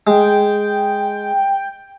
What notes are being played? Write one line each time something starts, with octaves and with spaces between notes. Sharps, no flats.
G#3 G5